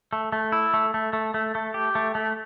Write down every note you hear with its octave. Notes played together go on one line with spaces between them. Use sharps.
A3
A3
E4
A3
A3
A3
A3
A3
G4
A3
A3